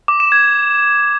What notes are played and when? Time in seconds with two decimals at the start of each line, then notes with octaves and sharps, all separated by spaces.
0.08 D6
0.20 E7
0.32 G#6